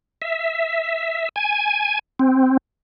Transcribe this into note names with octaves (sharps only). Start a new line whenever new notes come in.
E5
G#5
C4